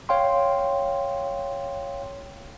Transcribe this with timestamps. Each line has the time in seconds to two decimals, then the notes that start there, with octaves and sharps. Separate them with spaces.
0.09 C#5 F5 G5 C6